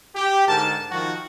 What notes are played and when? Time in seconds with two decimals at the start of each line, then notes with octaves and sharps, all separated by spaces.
0.15 G4
0.48 G#2 D3 A#4 A5
0.91 D#3 F3 F#4